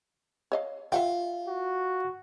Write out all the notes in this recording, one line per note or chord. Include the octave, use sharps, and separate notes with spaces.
C#5 D#5 F5
F4 E5 F#5 G5
F#4